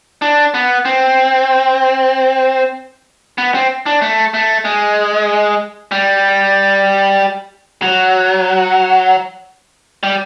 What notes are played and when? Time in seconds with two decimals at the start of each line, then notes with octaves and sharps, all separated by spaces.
0.22 D4
0.54 B3
0.85 C4
3.38 B3
3.54 C4
3.86 D4
4.02 A3
4.34 A3
4.65 G#3
5.92 G3
7.82 F#3
10.03 G3